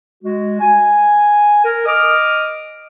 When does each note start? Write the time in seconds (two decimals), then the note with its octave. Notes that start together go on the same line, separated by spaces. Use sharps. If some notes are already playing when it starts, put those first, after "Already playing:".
0.24 G#3 F#4
0.60 G#5
1.63 A#4
1.85 D#5 D6 D#6 F6